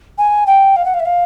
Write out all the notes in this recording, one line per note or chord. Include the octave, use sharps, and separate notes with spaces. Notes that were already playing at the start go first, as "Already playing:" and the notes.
G#5
G5
F5
F#5
F5
E5
F5